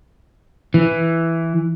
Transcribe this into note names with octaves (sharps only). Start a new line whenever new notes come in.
E3